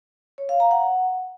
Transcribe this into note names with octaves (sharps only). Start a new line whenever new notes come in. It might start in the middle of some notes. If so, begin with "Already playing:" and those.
C#5
F5
A#5
F#5